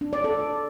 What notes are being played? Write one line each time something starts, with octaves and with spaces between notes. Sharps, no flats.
D4
D5
A4